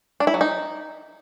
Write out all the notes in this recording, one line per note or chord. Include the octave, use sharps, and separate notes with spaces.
D4
E4
F#3
D#4